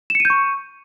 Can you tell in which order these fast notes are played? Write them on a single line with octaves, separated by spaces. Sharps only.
E7 C#7 D#7 G6 C#6